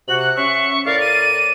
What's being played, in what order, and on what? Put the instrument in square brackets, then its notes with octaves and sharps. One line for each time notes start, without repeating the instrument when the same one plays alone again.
[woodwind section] C3 F#4 [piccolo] F#7
[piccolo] F#6
[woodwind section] C#4 E5 [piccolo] C#6
[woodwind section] A2 A#4 D5 [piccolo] F5
[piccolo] D#7